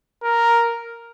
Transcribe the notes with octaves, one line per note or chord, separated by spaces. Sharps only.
A#4